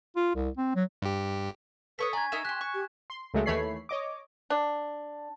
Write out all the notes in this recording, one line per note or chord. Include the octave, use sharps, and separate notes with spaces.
F4
C2
C4
F#3
G2 G4
A4 B4 C#5 C#6 D#6 B6
D4 G#5 A#5 G#6
D#4 A#4 E5 G#5 E7
G4 C6 F#6
C#6
G4
C6
C#2 F#3 G#3 A3
D#2 E3 A3 C#5 B5 C7
C#5 D#5 D6
D4